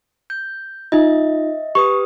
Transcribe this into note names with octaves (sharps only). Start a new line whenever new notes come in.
G6
D#4 F4 D#5 E5
G4 B4 C#6 D#6